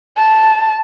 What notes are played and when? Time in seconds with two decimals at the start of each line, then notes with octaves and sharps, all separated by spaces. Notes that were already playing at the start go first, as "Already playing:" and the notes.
0.18 A5